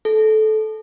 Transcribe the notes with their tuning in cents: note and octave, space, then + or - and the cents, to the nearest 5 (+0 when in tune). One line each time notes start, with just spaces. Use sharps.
A4 -20